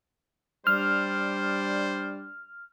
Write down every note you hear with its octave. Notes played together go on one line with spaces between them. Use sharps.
G3 D4 C5 D5 F6